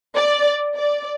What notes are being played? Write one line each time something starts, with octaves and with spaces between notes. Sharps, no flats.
D5
D5